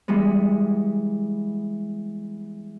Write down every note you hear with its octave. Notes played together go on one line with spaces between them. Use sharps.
E3 G3 G#3 B3